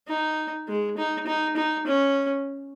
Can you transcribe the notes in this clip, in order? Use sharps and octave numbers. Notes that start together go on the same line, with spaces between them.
D#4
G#3
D#4
D#4
D#4
C#4